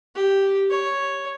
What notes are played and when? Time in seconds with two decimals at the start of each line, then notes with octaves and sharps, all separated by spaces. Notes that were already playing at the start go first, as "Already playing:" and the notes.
0.15 G4
0.70 C#5